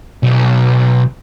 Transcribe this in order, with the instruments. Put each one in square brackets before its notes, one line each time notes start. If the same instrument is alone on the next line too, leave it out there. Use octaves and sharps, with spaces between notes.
[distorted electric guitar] B1